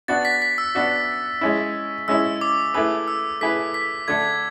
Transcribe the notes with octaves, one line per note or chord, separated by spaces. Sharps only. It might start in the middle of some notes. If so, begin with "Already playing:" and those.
B3 D4 F#4 A6
B6
B6
E6
B3 D4 F#4
G#3 C#4 E4
G#3 C#4 E4 E6
D6
A3 E4 G#4 B4 D6
E6
A3 E4 G#4 B4 B6
B6
D3 A3 D4 A4 G#6